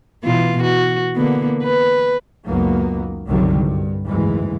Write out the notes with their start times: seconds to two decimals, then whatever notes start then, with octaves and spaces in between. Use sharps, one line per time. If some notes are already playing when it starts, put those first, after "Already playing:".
0.24 B2 E3 F4
0.63 F#4
1.16 D3 A#3 B3
1.63 B4
2.47 C#2 F#2 D#3 F#3 A#3 B3
3.28 C2 F#2 D3 D#3 F#3 G3
3.61 G2
4.05 F#1 D2 G#2 E3 G#3